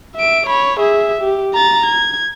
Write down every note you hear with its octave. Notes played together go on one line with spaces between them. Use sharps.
E5 D7
C#5 B5
G#4 E5
G4
A#5 A6
G#6